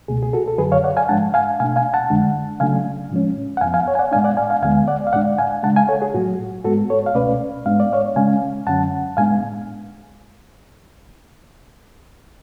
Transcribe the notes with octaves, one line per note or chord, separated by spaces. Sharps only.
C#2 B2 A3 G#4
G#4
F#4 A4
A4
F#2 D3 F#3 G#4 B4
C#5 F5
D5 F#5
F5 G#5
G#2 F3 G#3 D4 F#5 A5
F5 G#5
B2 A3 D4 F5 G#5
F5 G#5
F#5 A5
F2 D3 G#3 D4
C#3 F#3 A3 D4 F5 G#5
A2 F3 G#3 C#4
F#5
F2 F3 B3 F5 G#5
F5 G#5
C#5 F5
G#5
D5 F#5
A2 G#3 B3 D4 F5 G#5
D5 F#5
F5 G#5
F5 G#5
D2 D3 G#3 B3 F5 G#5
D5 F#5
F5
A2 G#3 D4 D5 F#5
F5 G#5
C#3 G#3 D4 F#5 A5
F5 G#5
A4 C#5
G#4
A2 F#3 A3 F#4
G#2 G#3 B3 F#4 A4
A4 C#5
F5
C#2 B2 A3 C#4 B4 D5
G#2 G#3 B3 D4 F5
D5
C#5 F5
C#3 G#3 C#4 F5 G#5
F#2 D3 F#3 C#4 F#5 A5
A2 G#3 B3 D4 F5 G#5